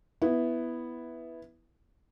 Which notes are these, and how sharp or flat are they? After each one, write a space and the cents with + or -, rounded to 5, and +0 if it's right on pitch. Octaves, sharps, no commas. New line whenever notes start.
B3 +0 E4 +0